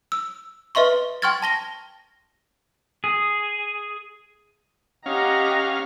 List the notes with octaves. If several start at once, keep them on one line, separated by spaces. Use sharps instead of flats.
E6
B4 D#5 E5 C6 C#6
G5 C6 C#6 F6 G#6 A6
A5 A#6 G7
G#4
C#4 G4 D#5 F5 F#5 A#5